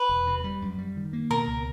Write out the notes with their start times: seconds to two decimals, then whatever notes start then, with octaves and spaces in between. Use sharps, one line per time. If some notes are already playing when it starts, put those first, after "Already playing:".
Already playing: B4
0.09 E1
0.27 C3
0.44 G3
0.62 F#2
0.78 G3
0.96 D#3
1.13 A#3
1.30 B2 A#4
1.47 C#2